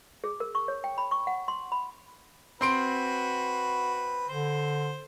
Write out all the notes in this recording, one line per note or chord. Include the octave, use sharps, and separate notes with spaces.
G#4
A#4
C#6
C#5
G5
B5
C#6
F#5
C6
B5
C4 F#4 B4 C6 D7
D3 C5